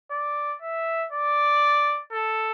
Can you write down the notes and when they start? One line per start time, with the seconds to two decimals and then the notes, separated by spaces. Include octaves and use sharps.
0.12 D5
0.62 E5
1.12 D5
2.12 A4